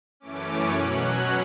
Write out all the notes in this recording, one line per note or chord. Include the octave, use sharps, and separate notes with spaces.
F#2 E3 A3 C#4 D6
B2 F#3 C#4 F#6